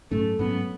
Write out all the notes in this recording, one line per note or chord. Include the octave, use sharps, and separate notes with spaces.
G#2 F#3 A3 C#4
G#2 F#3 B3 C#4